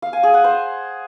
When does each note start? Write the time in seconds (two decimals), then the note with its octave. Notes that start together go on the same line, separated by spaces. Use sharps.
0.02 F5
0.13 G#5
0.23 G#4
0.34 F#5
0.44 C5